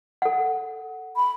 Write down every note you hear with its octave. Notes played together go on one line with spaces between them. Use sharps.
A4 F#5
B5